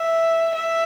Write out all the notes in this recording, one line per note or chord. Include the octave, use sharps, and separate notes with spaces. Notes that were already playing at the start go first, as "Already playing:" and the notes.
Already playing: E5
E5